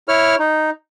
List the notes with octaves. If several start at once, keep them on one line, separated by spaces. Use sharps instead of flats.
E4 C#5 F6
D#4